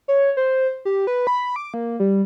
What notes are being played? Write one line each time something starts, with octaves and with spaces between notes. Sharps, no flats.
C#5
C5
G4
B4
B5
D6
A#3
G3